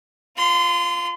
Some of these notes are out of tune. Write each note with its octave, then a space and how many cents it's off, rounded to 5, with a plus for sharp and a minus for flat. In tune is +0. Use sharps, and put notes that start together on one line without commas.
F4 +0 C6 -30